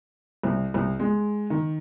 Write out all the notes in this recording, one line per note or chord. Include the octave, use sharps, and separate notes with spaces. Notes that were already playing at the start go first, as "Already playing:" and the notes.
C2
C2
G#3
D#3